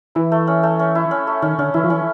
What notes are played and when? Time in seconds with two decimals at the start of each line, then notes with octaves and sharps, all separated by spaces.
0.15 E3 E4
0.32 A3
0.47 C#4
0.63 A3
0.79 C#4
0.95 E4
1.11 C#4
1.27 A3
1.42 D#3 C#4
1.59 D3 C#4
1.74 E3 E4
1.84 F3
1.90 E3 C#4